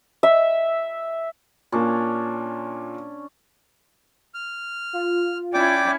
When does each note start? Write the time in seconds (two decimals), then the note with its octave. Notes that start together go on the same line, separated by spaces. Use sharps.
0.23 E5
1.72 A#2 A#3 C#4 D4
4.34 F6
4.93 F4
5.54 C#4 E4 D5 G5 D6